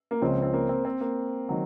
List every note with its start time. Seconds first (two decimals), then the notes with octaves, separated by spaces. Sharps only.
0.11 A#3
0.21 C#2 C#3 F3 C4
0.42 C4
0.53 A#3
0.69 C4
0.85 C4
1.01 A#3
1.49 D#3 F#3